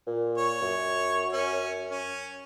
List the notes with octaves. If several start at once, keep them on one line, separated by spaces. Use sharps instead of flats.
A#2
C#5
F#2
C#4
C#4